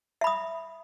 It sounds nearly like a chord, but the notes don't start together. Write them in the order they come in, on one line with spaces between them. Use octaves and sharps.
E5 B5 D#6